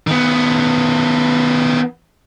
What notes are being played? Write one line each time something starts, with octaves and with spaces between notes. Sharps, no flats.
D#3 B3